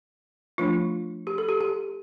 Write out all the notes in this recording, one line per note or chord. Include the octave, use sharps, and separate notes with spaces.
F3 A3 D4 F4
G4
A4
G4
G4